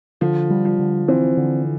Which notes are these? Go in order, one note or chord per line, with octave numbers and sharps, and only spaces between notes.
D3 F3
G3
F3
D3
E3 C4
D3